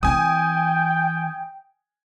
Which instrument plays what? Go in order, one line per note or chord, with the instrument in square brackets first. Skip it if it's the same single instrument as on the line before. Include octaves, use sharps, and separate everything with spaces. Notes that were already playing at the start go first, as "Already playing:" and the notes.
[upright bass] E3 C4 [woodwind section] G5 [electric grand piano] G#5 D#6